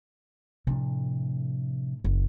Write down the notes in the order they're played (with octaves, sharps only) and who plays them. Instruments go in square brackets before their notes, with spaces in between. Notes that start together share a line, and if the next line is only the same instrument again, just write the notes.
[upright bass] A2 [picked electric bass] C3 F3 D4
[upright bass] F#1